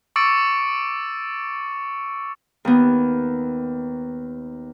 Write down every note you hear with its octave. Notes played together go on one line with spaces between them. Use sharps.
C#6 D6 E6 A6 C#7 D7
D#2 B3